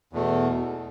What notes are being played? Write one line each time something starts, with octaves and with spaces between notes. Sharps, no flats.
E2 B2 A3